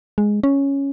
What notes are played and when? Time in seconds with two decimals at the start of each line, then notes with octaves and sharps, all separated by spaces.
0.18 G#3
0.43 C#4